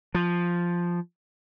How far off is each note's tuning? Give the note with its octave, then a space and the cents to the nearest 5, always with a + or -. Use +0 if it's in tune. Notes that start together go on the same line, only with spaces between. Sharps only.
F3 +0